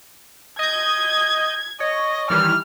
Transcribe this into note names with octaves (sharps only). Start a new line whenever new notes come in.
D#5 G6 G#6
C#5 D#5
D#3 E3 G3 F6